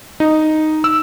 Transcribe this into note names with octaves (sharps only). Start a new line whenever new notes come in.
D#4
E6